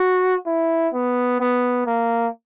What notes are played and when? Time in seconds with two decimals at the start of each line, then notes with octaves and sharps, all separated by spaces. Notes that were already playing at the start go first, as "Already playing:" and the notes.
Already playing: F#4
0.46 E4
0.93 B3
1.40 B3
1.86 A#3